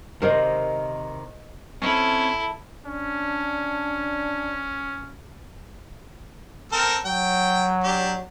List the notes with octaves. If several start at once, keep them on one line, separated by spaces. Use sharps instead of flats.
C3 D#3 A#4 C5 D#5
C4 C#4 E4 A4
C#4 D4
C4 A4 A#4
F#3 G5
D4 G4